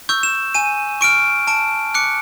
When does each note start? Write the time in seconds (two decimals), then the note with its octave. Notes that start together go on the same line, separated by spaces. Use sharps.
0.09 C#6 E6 G6
0.23 E7
0.55 G#5 D#7
1.01 C#6 F6 D7
1.47 A5 D7
1.94 D6 F#6 C#7